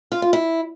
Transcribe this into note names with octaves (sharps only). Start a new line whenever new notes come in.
F4
F4
E4